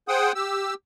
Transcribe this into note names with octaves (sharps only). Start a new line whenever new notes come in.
G#4 C5 F#5 G5 D#6
G4 E6